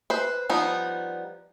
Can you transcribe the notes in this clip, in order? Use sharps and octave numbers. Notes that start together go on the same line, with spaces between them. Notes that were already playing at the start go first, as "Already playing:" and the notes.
B4 C5
F3 G3 B3 D#4